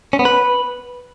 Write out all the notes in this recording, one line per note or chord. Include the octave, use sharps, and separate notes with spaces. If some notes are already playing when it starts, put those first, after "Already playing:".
C#4
B3
B4